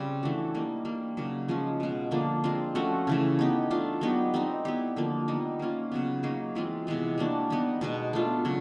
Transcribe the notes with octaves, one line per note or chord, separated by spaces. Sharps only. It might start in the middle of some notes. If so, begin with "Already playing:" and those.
Already playing: C#3 G3 C4
E3 A3 D4 F#4
G3 A#3 D#4
G3 A#3 D4
C#3 F#3 A#3 D#4
F3 G#3 C#4
B2 G#3 B3
D3 F3 A#3 D4
G#3 C4 F4
F3 A3 C#4 F#4
C#3 E3 A3
B3 D#4 G4
A3 D4 F4
F#3 B3 D#4 G4
G3 C4 D#4
B3 E4 G4
D3 F3 A#3
G3 B3 D#4
A#3 C#4 F4
C#3 F#3 B3
F#3 A#3 D#4 G#4
E3 G#3 C4 F4
C3 E3 G#3 B3
G3 A#3 D4 F#4
G3 B3 D#4
B2 G#3 B3
A3 D4 F4
C#3 F#3